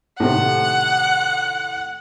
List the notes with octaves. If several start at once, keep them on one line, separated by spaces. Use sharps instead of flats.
A2 C3 D#3 F#5